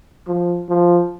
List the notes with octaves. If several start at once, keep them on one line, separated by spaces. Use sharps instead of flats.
F3
F3